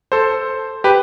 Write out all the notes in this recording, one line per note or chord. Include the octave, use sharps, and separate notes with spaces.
A4 C5
G4 B4